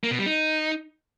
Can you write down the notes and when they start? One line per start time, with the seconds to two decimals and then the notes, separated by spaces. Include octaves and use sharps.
0.04 A#3
0.11 B2
0.19 G3
0.26 D#4